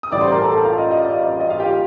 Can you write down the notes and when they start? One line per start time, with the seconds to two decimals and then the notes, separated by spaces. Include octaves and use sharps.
0.03 D#6
0.12 A1 A2 G3 D5 D6
0.21 C5 C6
0.32 A#4 A#5
0.41 A4 A5
0.52 A4 A5
0.64 F4 F5
0.78 D#5
0.91 D#5
1.04 D5
1.17 D#5
1.30 D5
1.40 D#5
1.50 F4 F5
1.60 G4 G5